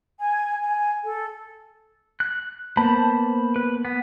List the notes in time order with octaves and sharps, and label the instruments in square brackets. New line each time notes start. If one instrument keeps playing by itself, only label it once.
[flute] G#5
G#5
A4
[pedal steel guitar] F#6
[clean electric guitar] A#3 B3 [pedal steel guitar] C5 A5 B5
[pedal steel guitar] B4
B3